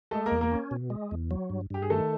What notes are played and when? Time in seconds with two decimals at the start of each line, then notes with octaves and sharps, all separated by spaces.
0.11 G#3 A3 A4
0.26 A#3 A#4
0.31 E2
0.41 A#3 A#4
0.52 C#4
0.71 B2
0.90 G#3
1.11 E2
1.31 F#3
1.50 G2
1.70 G2 G4
1.82 G#4
1.90 D#3 A3 A4